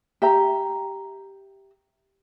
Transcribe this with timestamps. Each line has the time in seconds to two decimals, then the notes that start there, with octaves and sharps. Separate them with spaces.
0.22 G4 E5 A#5